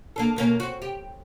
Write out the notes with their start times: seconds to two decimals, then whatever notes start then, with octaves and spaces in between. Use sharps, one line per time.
0.16 A#3 D4 A4
0.36 B2 A#3 C#4
0.60 C4 F#4
0.82 G4